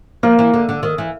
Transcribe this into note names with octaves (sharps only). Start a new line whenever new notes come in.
F3 A#3
E3
D3
D3
D#3
E3